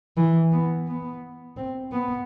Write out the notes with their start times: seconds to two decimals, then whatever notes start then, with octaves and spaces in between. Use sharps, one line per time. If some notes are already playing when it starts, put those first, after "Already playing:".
0.17 E3
0.52 B3
0.88 B3
1.57 C4
1.92 B3